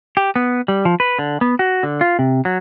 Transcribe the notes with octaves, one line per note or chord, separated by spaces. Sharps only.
G4
B3
G3
F3
B4
D3
B3
F#4
D3
F4
C3
F#3